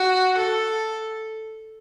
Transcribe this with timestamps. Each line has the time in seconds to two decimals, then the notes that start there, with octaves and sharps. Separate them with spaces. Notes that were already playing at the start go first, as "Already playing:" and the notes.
Already playing: F#4
0.37 A4